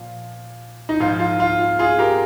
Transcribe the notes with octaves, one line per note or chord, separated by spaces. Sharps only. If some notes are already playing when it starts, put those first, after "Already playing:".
Already playing: A#2 F3
D#4
G#2 F3 F4
F4
F4
F4
F4 G#4
G4 A#4